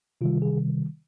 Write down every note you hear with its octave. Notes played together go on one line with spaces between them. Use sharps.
C3 D#3 G3 F4
G#4